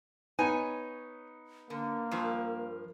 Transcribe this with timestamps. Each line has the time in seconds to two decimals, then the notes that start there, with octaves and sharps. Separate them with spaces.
0.39 B3 D#4 C#5 G#5
1.70 D3 A#3 A#4
2.11 G2 F3